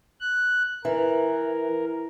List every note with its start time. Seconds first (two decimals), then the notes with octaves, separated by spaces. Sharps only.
0.20 F#6
0.85 E3 A#4